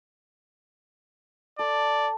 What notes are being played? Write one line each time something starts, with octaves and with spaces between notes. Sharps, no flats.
A4 D5